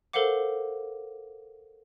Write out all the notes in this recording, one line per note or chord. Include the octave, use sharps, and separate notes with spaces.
A4 A#4 C5 F5 F#5 D6